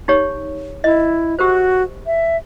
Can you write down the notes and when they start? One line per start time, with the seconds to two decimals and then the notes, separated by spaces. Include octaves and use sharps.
0.08 D#4 G4 C#5
0.84 E4 D#5
1.39 F#4 G4 A#4 C5
2.06 E5